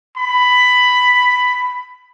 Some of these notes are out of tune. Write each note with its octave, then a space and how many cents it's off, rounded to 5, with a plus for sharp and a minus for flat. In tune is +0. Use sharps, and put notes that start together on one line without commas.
B5 +10